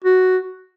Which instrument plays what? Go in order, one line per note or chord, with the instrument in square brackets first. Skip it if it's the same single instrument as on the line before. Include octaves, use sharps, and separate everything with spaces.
[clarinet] F#4